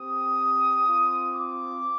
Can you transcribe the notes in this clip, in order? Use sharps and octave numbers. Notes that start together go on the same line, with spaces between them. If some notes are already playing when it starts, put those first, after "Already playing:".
Already playing: C4 G4 D#6
C4 F4
D6